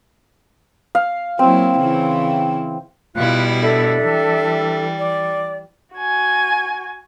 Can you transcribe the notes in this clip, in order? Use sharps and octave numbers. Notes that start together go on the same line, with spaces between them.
F5
F#3 A#3 C4 E4
C#3 E3 E4
B2 G3 E4 F4 F5 F#6
D4 A4 E5
E3 G3
D5
F#4 G#5